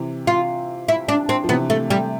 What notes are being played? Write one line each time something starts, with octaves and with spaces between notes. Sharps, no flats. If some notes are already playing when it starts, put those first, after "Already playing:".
Already playing: C3 E3
F4
E4
D4
C4
F3
C3 E3 B3
A3
G3